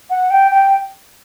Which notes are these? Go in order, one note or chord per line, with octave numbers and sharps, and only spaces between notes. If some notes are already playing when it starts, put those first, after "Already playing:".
F#5
G5
G5